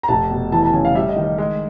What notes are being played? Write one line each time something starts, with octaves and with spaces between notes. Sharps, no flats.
A#5
F1 A5
B2
E3 A5
A5
C#3 G#5
F5
G3 E5
D#5
D#3
D#5
G#3